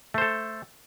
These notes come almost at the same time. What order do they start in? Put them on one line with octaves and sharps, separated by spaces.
A3 C5 A4